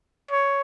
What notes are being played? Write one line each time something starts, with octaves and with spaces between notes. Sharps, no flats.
C#5